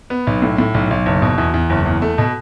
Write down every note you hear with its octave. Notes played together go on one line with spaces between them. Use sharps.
B3
B1
A2
A2
B1
B1
F#1
B2
E2
E2
F#1
E2
A3
B2